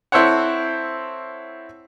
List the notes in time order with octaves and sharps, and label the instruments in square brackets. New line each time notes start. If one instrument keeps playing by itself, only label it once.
[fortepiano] C4 E4 A4 C5 C#5 F#5